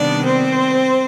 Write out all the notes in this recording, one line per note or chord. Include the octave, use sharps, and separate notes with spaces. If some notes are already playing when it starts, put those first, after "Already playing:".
Already playing: C3 D#3 G3 B3 D4 D5
C4 C5